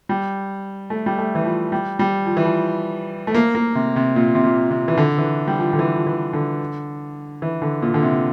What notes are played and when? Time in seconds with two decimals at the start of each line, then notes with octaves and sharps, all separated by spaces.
0.09 G3
0.90 A3
1.06 G3
1.18 A3
1.35 E3
1.45 F3
1.72 G3
1.99 G3
2.26 F3
2.37 E3
2.45 F3
3.27 A3
3.34 A#3
3.55 A#3
3.75 C3
3.96 C3
4.16 A#2
4.35 C3
4.44 A#2
4.70 C3
4.88 E3
4.97 D3
5.18 E3
5.48 G3
5.59 F3
5.73 D3
5.79 E3
5.95 F3
6.07 E3
6.33 D3
7.42 E3
7.62 D3
7.82 A#2
7.94 D3
8.03 C3